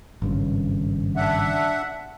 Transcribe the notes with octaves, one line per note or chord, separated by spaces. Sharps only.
G#1 G2 C#3
D4 E5 F#5